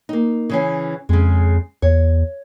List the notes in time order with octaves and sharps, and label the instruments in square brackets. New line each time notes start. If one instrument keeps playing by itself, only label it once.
[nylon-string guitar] A#3 D#4
C#3 E3 C#4
[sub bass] F2 [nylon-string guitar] C#3 G#3
[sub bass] E2 [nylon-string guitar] C#5